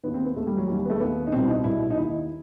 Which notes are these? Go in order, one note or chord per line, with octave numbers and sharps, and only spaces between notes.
D#2 D#3 B3
C4
B3
D#2 D#3 A3
G3
F#3
D#2 D#3 G3
G3
B3
A3
D#2 D#3 B3
D#4
C2 B2 C4
E4
D#4
C2 B2 E4
D#4
D#2 D#3 E4